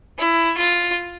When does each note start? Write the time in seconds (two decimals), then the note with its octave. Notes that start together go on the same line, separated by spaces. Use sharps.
0.18 E4
0.57 F4